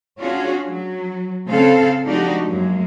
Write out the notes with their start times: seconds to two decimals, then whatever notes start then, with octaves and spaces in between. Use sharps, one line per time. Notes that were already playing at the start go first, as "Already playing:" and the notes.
0.19 C#4 D4 F4 F#4 G#4
0.67 F#3
1.47 C#3 C4 A4 C5 F5
2.05 F3 G#3 D4 D#4 F#4 G4
2.44 F#2 G#3 A#3